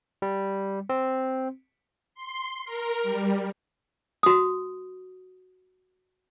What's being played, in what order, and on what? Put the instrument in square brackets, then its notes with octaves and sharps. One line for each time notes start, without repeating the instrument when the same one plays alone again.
[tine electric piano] G3
C4
[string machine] C6
A#4
G3
[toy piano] F#4 D#6